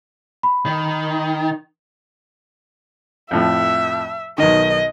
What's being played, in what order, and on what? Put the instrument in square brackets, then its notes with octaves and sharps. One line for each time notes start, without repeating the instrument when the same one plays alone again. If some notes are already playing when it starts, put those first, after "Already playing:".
[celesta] B5
[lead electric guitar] D#3
[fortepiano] F2 A2 F3 [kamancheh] E5
[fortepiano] B1 D#3 [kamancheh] D#5